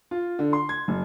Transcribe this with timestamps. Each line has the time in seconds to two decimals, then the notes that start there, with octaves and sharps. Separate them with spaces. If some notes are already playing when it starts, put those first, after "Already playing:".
0.11 F4
0.39 D3
0.53 C6
0.69 G#6
0.88 F#1